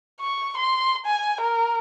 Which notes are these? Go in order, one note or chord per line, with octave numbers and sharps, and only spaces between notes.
C#6
C6
G#5
A#4